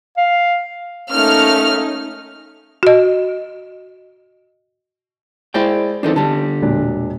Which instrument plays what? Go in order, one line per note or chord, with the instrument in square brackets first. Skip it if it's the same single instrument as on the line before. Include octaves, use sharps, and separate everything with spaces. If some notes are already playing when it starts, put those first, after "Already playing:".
[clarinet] F5
[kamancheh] A3 A#3 [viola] C#4 D#4 [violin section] F6
[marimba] F#4 D#5
[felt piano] G#3 E4 [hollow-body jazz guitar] C5 D5 G5
[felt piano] E3 C4 [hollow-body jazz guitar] D4 D#4 A4
[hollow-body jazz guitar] D3 G3 [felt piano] A5
[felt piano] E1 A#2 D4